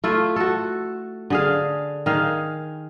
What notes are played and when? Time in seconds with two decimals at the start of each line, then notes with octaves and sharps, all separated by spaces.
0.04 A3 E4 F4
0.36 F#4 A4
1.30 D3 G#4 F5
2.06 D#3 G#4 F5